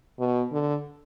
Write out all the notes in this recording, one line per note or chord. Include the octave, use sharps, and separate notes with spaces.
B2
D3